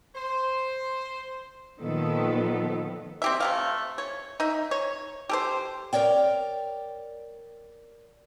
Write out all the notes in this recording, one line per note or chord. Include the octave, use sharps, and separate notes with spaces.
C5
A#2 D#3 F3 B3 A4
C4 G4 E5
C3 A3 F5
C#5
D#4 E5
C#5
G4 A4 C5
A#4 C#5 D5 G5